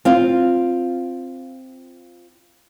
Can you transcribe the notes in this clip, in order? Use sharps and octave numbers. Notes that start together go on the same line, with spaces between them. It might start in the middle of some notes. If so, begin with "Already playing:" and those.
C4 F4